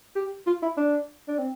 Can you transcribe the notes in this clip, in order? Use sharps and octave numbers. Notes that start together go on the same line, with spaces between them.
G4
F4
E4
D4
D4
C4